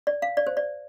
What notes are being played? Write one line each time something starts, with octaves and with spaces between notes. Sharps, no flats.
D5
F5
D5
C5
D5